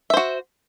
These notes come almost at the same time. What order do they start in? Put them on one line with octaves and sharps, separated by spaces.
E5 C5 F#4